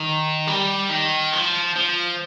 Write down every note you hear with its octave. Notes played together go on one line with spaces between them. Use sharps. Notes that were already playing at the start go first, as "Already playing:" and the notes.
Already playing: D#3
G3
D#3
F3
F3